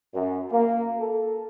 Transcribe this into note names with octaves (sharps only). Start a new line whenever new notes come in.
F#2
A#3
A4